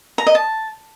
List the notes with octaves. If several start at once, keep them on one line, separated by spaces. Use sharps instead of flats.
A#5
D#5
A5